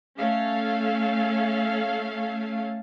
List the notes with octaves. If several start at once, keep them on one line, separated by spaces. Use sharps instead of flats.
A3 C#4 A4 C#5 F5